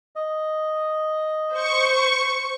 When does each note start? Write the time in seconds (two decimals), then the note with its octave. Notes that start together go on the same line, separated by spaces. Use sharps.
0.16 D#5
1.53 C5 C#6